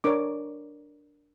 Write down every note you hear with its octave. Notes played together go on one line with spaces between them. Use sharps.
D4 A#4 C#5 D6